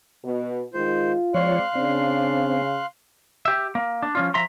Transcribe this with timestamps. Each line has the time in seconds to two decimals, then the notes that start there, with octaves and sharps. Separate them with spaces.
0.23 B2
0.74 D#3 G#3 F4 C5
1.34 F3 G#3 C4 C#5 D5 F5 C6 F#6
1.75 C#3 C4 D4 D5
3.45 G4 E5
3.75 A#3
4.03 D4
4.15 F3 C#4 F4
4.34 F3 E5 A#5 C6